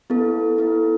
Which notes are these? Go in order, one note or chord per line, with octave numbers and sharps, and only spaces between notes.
B3 E4 A4
B3 E4 A4